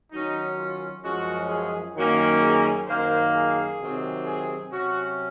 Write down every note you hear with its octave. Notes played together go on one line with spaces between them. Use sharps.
D#3 F#3 C#4 D#4
F4
F#2 F3 G#3 C#4 F#4
G#4
F#2 D#3 F#3 A#3 C#4
G#4
F#2 D#3 A#3 C5
G#4
C3 D#3 F#3 C4
G#4
C3 F#3 C#4 F#4